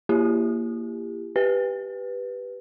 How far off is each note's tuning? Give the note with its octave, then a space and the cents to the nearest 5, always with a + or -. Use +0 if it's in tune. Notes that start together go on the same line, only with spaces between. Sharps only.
A#3 +0 E4 +45 G4 +30
G4 +0 B4 +0